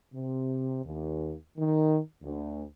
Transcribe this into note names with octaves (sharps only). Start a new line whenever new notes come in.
C3
D#2
D#3
D2